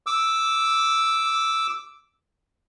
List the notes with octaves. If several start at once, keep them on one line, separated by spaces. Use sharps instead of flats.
D6 E6